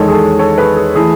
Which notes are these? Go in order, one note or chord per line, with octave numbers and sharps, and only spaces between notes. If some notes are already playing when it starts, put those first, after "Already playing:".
Already playing: E2 D#3 G#3 A4 C#5
G#4
A4
A4 C#5
G#4 B4
G#4
E3 A3 G#4